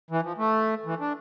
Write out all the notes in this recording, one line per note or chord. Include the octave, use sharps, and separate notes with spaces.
E3
F3
A3
E3
D4